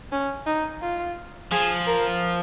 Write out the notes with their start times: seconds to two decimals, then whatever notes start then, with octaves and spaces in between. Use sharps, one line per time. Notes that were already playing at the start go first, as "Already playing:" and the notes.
0.12 C#4
0.47 D#4
0.82 F4
1.52 F3 G#4
1.87 A#4